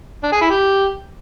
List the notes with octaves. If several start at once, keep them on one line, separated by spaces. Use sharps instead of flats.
D4
G#4
E4
G4